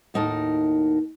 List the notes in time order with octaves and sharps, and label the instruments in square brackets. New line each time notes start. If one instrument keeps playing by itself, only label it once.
[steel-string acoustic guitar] D#2 A2 D#4 F#4 A#4 A5